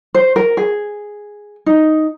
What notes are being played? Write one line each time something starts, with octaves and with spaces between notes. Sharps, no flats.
C5
A#4
G#4
D#4